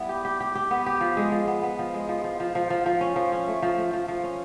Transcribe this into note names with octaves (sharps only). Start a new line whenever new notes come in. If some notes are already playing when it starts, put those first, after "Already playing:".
Already playing: G3 B3 E4
G4
G4
G4
G4
B3
G4
F3
G#3
F3
B3
B3
F3
G#3
F3
F3
F3
F3
F3
F3
C#4
F3
C#4
A3
F3
A3
F3
F3
C#4